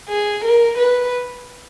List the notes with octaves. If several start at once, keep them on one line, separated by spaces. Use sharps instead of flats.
G#4
A#4
B4